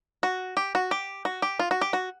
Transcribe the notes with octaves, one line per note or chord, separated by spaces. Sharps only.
F#4
G4
F#4
G4
F#4
G4
F4
F#4
G4
F#4